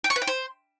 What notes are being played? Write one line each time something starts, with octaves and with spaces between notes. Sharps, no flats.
G5
C#6
B4
G5
C5